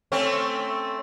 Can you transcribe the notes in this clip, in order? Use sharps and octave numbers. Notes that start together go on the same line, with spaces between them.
A3 C4 C#4